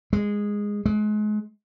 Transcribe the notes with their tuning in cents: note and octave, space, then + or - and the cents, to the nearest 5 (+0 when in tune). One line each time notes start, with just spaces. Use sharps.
G#3 -10
G#3 +30